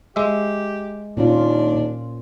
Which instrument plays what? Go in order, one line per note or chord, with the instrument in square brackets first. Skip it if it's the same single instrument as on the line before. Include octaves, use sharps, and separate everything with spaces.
[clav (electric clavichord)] G#3 E5 [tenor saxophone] G4
[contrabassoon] D#2 [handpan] A#2 C#4 F4 [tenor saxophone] D4